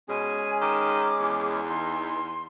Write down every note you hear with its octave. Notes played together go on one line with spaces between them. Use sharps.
B2 G#3 C#4 G#4 G#5
D#3 D6
E2
E3 D#4 C6